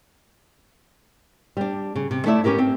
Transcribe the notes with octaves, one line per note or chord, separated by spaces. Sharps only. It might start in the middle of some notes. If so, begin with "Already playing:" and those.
G3 D4
C#3
C3
A3 E4 C#5 D5 E5
B3 C#4 G4 A#4 E5
C4